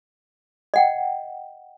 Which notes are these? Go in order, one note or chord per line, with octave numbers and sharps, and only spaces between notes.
D#5 F#5 G5